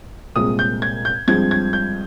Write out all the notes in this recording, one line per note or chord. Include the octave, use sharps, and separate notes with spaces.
C2 A#2 G#3 C4 D#6
G6
G#6
G6
G2 F3 G#3 C4 G#6
G#6
G6